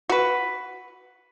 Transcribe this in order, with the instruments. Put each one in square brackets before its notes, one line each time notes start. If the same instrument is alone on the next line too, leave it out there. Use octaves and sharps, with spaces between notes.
[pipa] F#4 B4